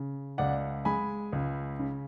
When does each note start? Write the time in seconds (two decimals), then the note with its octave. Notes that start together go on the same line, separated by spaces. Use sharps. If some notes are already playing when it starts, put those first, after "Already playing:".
Already playing: C#3
0.38 C#2 D5 F#5
0.85 G#3 G#5 B5
1.33 C#2
1.79 C#3